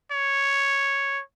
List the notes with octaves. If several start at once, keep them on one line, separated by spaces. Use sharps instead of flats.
C#5